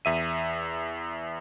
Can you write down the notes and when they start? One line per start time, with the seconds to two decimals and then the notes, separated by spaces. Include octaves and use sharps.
0.05 E2 E5 D#7